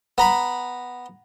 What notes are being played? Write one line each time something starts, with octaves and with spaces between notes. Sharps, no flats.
B3 A#5 B5